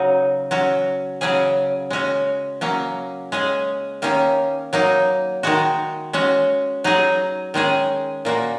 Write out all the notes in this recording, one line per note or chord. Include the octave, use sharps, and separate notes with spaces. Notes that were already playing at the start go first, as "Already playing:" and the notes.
Already playing: C#3 F#3 D#4 F#4
F#3 C#4 F#4
C#3 F#3 C#4 G#4
G#3 C#4 F#4
F#3 A#3 C#4
G#3 C#4 G#4
D#3 A#3 C#4
F#3 A#3 D#4
D#3 G#3 F#4
G#3 C#4 F#4
F#3 D#4 G#4
D#3 G#3 C#4 G#4
A#2 A#3 F#4